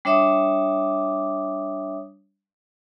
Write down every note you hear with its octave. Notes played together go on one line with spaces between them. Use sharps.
G3 D4 C#5 E5 D6 D#6